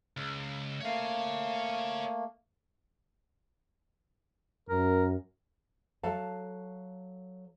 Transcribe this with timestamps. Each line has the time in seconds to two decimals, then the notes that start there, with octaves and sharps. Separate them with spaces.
0.17 C#2
0.81 A3 A#3 C#5 F5
4.69 F#2 A#4
6.03 F#3 A4 F5 A5